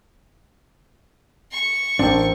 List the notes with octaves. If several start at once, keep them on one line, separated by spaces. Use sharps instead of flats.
C#6
A1 C4 D4 A#4